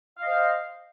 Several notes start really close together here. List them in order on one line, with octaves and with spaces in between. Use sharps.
F5 D#5 C5